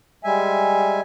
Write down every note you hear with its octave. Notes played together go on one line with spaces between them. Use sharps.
G3 G#3 E5 G#5